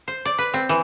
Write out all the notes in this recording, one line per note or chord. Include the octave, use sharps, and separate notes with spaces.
C5
D5
B4
C4
E3